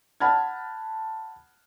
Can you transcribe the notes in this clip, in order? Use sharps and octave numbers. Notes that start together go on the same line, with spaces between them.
F#5 A5 B5 F6 G#6